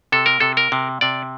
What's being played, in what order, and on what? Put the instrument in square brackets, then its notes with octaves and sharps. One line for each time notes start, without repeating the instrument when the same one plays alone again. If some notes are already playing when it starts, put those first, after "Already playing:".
[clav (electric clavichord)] C3 A4
A#4
C3 A4
A#4
C3
C3 D5